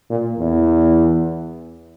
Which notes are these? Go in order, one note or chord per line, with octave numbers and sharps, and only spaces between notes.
A#2
E2